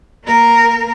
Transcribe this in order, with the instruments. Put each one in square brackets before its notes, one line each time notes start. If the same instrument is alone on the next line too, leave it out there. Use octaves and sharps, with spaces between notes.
[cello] A#3 A#4